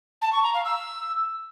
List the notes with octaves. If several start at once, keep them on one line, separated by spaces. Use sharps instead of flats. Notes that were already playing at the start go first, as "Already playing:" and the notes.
A5
C#6
A#5
F5
E6